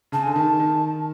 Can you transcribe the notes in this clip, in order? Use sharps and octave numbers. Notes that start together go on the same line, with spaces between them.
C#3 A5
D3 G#5
D#3 A5
D#3